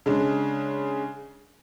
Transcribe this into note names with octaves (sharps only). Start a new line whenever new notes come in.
C#3 G#3 D4